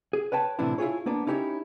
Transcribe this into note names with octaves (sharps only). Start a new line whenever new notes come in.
G#4
B4 C#5 G5 A5
A2 C3 E3 D4 E4
E4 F4 G#4 C#5
A#3 B3 D4
C#4 D#4 E4 G4 C5 C#5